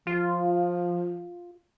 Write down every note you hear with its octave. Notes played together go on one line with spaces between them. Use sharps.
F3 F4